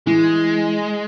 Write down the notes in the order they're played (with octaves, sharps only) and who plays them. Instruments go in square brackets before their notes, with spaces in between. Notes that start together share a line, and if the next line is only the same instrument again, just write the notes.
[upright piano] E3 [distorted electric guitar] G#3